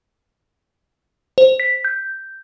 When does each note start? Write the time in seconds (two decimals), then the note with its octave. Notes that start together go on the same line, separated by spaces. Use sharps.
1.38 C5
1.60 B6
1.85 G6